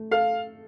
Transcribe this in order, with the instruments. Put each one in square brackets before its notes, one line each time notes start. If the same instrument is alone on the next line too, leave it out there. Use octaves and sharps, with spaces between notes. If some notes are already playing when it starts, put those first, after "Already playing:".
Already playing: [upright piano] A3
[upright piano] A4 [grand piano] F5